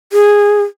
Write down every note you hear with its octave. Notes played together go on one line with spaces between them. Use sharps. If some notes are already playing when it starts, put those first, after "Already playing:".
G#4